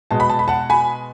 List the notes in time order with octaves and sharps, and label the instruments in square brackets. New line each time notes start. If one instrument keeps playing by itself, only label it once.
[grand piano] B2 G#3 A5
B5
A5
B5
F#5 A5
G#5 B5